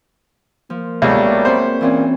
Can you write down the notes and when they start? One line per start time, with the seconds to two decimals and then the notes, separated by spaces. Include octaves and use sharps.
0.70 F3 A#3
1.02 C#2 F#3 G3 A3 B3 F#4 G#4
1.45 C4 F#4 B4 C5
1.81 A#2 E3 C4 C#4